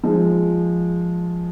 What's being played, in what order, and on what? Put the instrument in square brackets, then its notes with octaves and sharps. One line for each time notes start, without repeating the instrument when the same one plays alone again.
[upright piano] F3 G#3